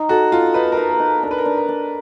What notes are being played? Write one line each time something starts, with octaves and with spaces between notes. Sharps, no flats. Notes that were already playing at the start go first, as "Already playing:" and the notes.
Already playing: D#4
F#4 A4
F4 A4
D#4 B4
D#4 A#4
A#4
D#4
D4 A#4
B4
A#4
D4
A#4
D4